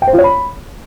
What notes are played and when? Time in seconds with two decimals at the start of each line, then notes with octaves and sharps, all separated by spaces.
0.02 G5
0.07 C5
0.13 F4
0.19 C#5
0.24 B5